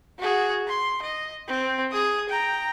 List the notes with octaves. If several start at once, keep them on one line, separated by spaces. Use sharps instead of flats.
F#4 G#4
C6
D#5
C4
G#4 D#6
G5 A#5